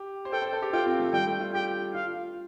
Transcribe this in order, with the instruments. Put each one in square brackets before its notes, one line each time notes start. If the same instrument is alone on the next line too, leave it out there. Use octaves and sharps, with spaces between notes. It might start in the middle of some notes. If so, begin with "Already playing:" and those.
Already playing: [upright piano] G4
C5
[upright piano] A4 [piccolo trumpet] G5
[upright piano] C5
A4
G4
[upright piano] F4 [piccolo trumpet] G5
[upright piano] C4
A3
[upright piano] G3 [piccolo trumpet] G5
[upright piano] A3
F4
[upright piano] G4 [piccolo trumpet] G5
[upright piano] F4 [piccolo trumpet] F5